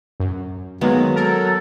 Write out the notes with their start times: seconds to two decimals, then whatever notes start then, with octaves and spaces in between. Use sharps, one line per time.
0.20 F#2
0.81 D#3 F#3 G#3 A#3 B3
1.16 A4 A#4